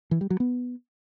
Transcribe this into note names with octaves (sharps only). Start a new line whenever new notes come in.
E3
G3
F#3
B3